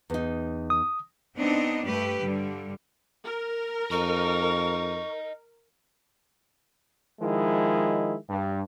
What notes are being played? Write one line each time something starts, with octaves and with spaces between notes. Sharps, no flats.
E2 D#4
D#6
B3 C4 D4 D#4 D#5
G2 A3 G4 B4
G2 D3 G3
A#4
F2 D#5 A#5 C#6
D#3 F3 G#3 E4
G2